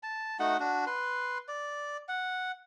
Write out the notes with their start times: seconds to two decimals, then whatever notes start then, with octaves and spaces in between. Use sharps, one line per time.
0.03 A5
0.40 A3 D#4 F#4 F#5
0.60 D4 F#4
0.87 B4 C6
1.48 D5
2.08 F#5